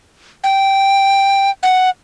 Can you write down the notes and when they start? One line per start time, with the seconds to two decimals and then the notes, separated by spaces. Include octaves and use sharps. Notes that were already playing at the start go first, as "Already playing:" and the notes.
0.44 G5
1.63 F#5